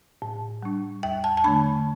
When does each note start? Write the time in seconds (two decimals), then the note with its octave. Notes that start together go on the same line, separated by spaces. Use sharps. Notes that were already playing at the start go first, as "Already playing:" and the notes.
0.22 A2
0.63 G3 D4
1.03 E2 G5
1.24 A5
1.37 A5
1.44 D3 A3 D4 B5